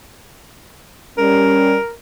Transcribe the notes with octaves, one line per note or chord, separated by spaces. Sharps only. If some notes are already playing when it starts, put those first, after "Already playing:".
G3 C#4 A#4